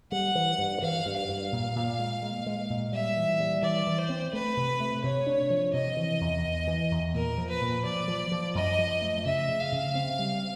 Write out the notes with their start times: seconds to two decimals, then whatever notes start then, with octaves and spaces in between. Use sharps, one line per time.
0.11 G3 F#5
0.35 E3
0.58 G2
0.82 E3 F5
1.06 G2
1.17 F5
1.29 G2
1.52 A#2
1.76 A#2
1.99 G#3
2.23 G#3
2.46 G#3
2.70 A#2
2.92 G3 E5
3.16 E3
3.40 G3
3.62 E3 D5
3.87 E3
3.98 C5
4.10 C4
4.33 A3 B4
4.57 C3
4.80 A3
5.03 C3 C#5
5.27 D4
5.50 F3
5.73 C3 D#5
5.97 E3
6.21 E2
6.44 E2
6.67 E3
6.91 E2
7.14 A#2 A#4
7.38 F3
7.49 B4
7.61 A#2
7.85 F3 D5
8.08 F3
8.32 F3
8.55 F#2 D#5
8.79 F3
9.02 A3
9.25 C#3 E5
9.48 C#3
9.60 F5
9.72 C#3
9.95 C4
10.19 G3